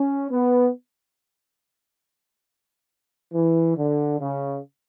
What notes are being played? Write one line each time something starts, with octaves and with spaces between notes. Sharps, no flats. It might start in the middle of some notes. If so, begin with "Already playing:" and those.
Already playing: C#4
B3
E3
D3
C#3